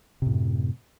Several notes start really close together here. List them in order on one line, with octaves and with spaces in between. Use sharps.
C3 A2 F#2